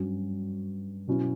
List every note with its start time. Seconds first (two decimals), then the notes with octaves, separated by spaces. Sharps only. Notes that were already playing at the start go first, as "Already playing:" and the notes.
Already playing: G2 F#3 C#4 F#4
1.07 B2 F#3 C#4 E4